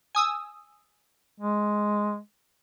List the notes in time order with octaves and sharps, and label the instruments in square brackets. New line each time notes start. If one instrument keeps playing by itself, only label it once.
[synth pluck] G#5 D#6 E6
[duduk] G#3